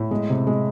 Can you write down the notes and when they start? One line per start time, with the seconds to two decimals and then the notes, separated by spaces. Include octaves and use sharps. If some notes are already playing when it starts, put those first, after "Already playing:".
Already playing: A2
0.11 G#3
0.29 C3
0.47 G#3